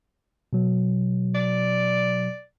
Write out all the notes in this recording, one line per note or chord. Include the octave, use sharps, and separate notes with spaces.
B2 F#3
D5